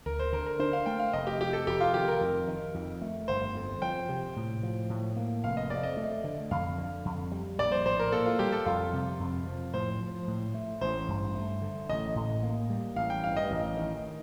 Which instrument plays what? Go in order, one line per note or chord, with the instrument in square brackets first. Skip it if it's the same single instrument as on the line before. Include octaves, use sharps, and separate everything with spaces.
[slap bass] D2 [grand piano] A#4
[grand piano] C5
[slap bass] D3 [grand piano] A#4
[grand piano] A#4
[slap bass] D4 [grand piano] C5
[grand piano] F5
[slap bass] A3 [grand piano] G5
[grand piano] F5
[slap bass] F1 [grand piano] D#5
[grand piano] G4
[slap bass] F2 [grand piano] G4
[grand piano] A4
[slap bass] F1 [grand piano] G4
[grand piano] F4
[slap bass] D#3 [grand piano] G4
[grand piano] A#4
[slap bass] F2
D#3
F2
A3
[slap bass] G1 [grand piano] C5
[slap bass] F2
[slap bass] F3 [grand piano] G5
[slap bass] C3
A2
F3
A2
A#3
[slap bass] F1 [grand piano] F5
[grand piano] D#5
[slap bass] F2 [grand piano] D5
[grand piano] D#5
[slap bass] A3
D3
[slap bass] F2 [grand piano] F5
[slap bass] D3
F2
G3
[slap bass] A#1 [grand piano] D5
[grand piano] C5
[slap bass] A2 [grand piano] C5
[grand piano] A#4
[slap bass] A#3 [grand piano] A4
[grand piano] F4
[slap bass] G3 [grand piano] G4
[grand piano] A4
[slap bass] F2 [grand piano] F4
[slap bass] C3
F2
F3
[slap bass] A2 [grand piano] C5
[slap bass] F3
A2
A3
[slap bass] A1 [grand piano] C5
[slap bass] G2
A3
D3
[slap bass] A1 [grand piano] D#5
[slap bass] A2
A#3
G3
[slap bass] A1 [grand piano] F5
[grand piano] G5
[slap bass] G2 [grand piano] F5
[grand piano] D#5
[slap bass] A1
D#3